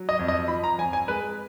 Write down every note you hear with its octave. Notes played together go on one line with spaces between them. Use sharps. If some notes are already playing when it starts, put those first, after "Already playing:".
Already playing: F#3
D#5
F2
D#5
F3 B5
A#5
F2 G#5
G#5
G#3 B4